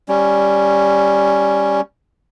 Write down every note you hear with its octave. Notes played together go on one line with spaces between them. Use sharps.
G3 C#4